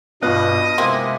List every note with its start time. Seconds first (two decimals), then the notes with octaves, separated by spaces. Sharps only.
0.22 G2 B2 B3 F4 D#5 F#6
0.78 C3 G#3 A#3 C4 E4